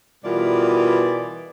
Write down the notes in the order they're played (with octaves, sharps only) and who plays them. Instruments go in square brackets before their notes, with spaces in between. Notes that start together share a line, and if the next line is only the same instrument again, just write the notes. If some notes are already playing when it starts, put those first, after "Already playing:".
[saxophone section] B2 E3 G3 F4 A#4 D5